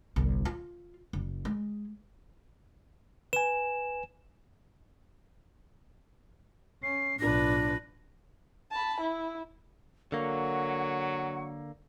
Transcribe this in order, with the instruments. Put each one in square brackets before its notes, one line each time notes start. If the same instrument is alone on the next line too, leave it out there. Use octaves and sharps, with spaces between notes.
[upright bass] G1 C2
F4
F#1
G#3
[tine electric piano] B4 G#5 [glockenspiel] E7
[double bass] C#4 [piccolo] C7
[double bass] B1 A2 [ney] D4 [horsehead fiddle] F4 B4 [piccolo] A#6
[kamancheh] A5 B5
E4
[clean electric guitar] D3 A#3 [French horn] F#3 [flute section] F#5 [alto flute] C#6